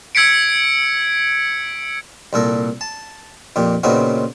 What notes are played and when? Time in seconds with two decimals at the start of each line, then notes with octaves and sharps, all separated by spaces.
0.15 E6 G#6 B6 C#7 D7
2.33 C2 A#2 A4 A#5
2.81 A5
3.56 F2 A#2 G4
3.83 A#2 C#3 B3 C4 D#4 F#4